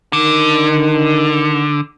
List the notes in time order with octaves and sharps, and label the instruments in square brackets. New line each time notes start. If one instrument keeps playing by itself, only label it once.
[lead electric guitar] D3 [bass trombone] D#3